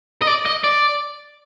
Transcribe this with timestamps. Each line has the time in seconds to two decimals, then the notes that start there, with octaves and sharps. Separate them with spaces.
0.22 D#5
0.27 D5
0.45 D#5
0.64 D5